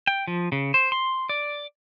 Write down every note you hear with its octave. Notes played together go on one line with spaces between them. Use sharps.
G5
F3
C#3
C5
C6
D5